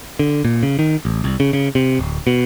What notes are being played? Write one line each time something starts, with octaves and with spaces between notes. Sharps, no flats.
D3
A#2
C#3
D#3
A1
C2
C#3
C#3
C3
D1
B2